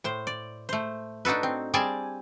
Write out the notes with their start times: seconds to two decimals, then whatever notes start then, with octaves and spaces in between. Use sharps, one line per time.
0.04 A2 C5
0.27 D5
0.69 A3 C5
1.25 D4 D#4 F#4 A4 B4
1.43 C4
1.74 G3 C4 G#4 D5 G#5 A5